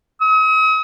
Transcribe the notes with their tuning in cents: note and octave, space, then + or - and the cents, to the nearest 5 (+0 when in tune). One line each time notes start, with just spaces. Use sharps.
D#6 +40